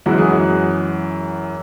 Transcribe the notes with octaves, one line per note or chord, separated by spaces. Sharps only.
F#2 E3 G#3 F#4
G#4
F#4